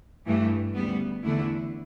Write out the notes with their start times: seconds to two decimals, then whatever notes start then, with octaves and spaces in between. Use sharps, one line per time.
0.26 G2 E3 A3
0.74 D2 C#3 G3 B3
1.23 E2 D3 A3 E4